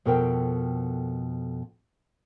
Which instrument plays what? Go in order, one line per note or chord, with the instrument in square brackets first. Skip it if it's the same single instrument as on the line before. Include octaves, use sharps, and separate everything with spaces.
[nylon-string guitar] F2 B2 A4 A#4 C5 G5